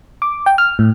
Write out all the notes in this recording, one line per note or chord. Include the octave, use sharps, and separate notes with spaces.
D6
G5
F6
A2